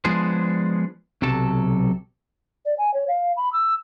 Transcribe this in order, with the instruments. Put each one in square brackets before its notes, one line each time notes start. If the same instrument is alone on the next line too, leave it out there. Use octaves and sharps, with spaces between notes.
[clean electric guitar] F3 G#3 B3 D4 G#4 C5
B1 C3 F#3 A4 A5
[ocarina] D5
G#5
C#5
F5
B5
E6